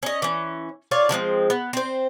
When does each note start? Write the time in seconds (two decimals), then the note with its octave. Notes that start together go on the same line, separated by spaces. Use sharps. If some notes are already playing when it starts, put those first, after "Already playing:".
0.03 C#4 D#5
0.22 E3 C#4
0.91 F4 C#5 D5 F5
1.09 D3 F3 G#3 C4
1.50 B3
1.73 C4 C5